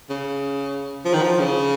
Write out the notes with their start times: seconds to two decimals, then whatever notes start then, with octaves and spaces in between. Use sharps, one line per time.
0.10 C#3
1.05 F3
1.13 D#3
1.22 F3
1.39 C#3